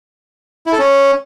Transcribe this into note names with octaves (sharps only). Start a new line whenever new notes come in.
E4
A4
C#4